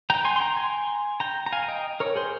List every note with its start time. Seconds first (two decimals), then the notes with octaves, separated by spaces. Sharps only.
0.10 G5 A#5
0.25 G#5 C6
0.36 C6
0.40 G5 A#5
0.57 G#5 C6
1.20 G5 A#5
1.46 A#5
1.52 F5 G#5
1.63 G#5
1.68 D#5 G5
2.00 A#4 C#5
2.16 G#4 C5